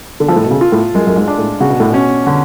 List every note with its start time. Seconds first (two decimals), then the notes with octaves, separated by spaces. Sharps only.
0.20 D3
0.28 F3 A4
0.36 A2
0.44 B2
0.51 C#3
0.61 F4
0.72 A2
0.94 F#2 G#3
1.07 F#2
1.16 G#2
1.28 D4
1.38 A2
1.60 C#3 F#4
1.70 B2
1.80 A2
1.90 B2 C#4
2.27 D3